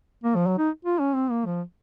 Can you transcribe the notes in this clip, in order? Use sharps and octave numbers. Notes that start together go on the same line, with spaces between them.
A#3
F3
F#3
D#4
F4
C#4
C4
A#3
F3